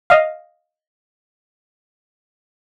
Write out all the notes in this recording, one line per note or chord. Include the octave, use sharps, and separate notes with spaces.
D#5 F5